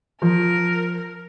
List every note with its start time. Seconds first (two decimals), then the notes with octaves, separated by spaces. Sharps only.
0.22 F3 A#4